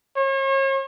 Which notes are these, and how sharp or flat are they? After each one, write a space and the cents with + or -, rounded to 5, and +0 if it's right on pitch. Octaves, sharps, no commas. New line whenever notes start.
C#5 -40